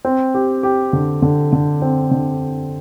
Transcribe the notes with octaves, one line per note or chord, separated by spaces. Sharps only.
C4
G4
G4
D3
D3
D3
C4
D3